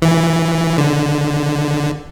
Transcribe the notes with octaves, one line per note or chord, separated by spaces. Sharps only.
E3
D3